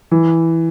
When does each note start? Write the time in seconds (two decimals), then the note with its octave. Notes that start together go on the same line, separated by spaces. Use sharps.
0.12 E3